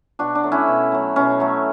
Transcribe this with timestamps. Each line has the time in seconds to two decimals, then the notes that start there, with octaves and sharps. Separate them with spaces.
0.19 B2 D4 F#4
0.35 D4
0.44 F#3 A3
0.52 C#4 E4
0.68 B2
0.92 F#3 A3
1.16 B2 C#4
1.40 F#3 A3